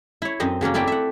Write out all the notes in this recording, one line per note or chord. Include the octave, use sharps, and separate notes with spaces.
E4 C#5
F#2 C4 C5 D#5
C#3 F#3 A#3 C#4
A3 C4 E4 D5 G5
E5 F#5